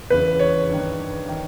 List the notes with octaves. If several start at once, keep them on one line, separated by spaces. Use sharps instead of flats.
E2 C#3 E3 B4
C#5
G2 D#3
D#3